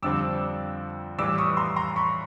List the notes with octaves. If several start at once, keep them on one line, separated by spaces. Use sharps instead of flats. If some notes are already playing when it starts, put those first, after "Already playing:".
F2 D3 G3 C4 D6 E6
A2 E3 G3 D6 E6
C#6 D#6
A#5 C6
A#5 C6
B5 C#6